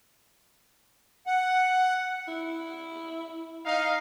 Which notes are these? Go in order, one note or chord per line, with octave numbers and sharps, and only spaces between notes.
F#5
E4
D#4 F5